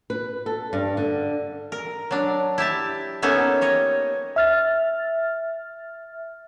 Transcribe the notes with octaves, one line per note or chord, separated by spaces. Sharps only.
B4
A4
G2
D3
A#4
F#3 D4
E4 G4 E5 A5
A#3 B3 C#4 D#4 A4 E5
G3 C#5 D#5
E5 F6 A6